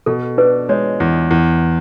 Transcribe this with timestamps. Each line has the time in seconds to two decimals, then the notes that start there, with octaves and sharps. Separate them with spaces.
0.06 B2 A4
0.38 D4 B4
0.69 G#3 C#5
1.00 E2
1.31 E2